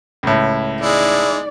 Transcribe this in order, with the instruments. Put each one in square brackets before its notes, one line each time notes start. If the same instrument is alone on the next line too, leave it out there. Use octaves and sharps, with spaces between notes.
[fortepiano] C#2 A2
[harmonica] G#3 E4 [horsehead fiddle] D#4 D5